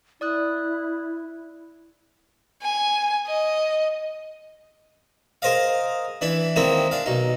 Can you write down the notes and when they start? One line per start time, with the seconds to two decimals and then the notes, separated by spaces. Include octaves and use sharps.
0.21 E4 D5 D#6 F#6
2.62 G#5
3.27 D#5
5.42 G#4 A#4 C5 D#5 F5
6.21 E3 D4 E4
6.56 D#3 G#3 A#3 C4 E4
6.91 D4 F5
7.06 B1 D#4